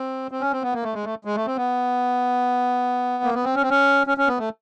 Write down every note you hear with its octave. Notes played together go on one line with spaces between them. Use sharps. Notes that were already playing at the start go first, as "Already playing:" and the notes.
Already playing: C4
C4
C#4
C4
B3
A#3
A3
G#3
A3
G#3
A3
C4
B3
A#3
B3
C4
C#4
C4
C#4
C#4
C#4
B3
A3